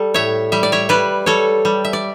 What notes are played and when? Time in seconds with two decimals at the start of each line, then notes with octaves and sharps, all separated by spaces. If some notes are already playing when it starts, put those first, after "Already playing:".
Already playing: G3 A4
0.14 A2 C#5 E5
0.52 G3 E5
0.63 D5
0.72 C#5 E5
0.89 G3 B4 D5
1.26 G3 A4 C#5
1.65 G3
1.85 E5
1.93 D5